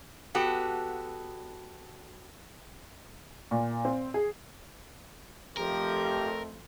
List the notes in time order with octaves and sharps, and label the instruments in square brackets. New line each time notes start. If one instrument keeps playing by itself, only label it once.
[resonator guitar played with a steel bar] B3 F#4 G4 A4
[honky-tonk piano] A#2
C4
G#4
[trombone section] F2 A3 [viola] F3 [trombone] G4 [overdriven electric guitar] A#4